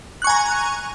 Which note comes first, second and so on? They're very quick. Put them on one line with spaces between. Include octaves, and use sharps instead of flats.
F#6 C#6 G#5 A#5